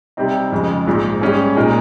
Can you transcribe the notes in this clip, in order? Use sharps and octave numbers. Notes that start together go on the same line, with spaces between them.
C3 G3 C4 D#4
F2 C#3 G#3
A#1 G#2 F3
G#2 G3 C#4 G#4
A#2 G#3 D#4 A#4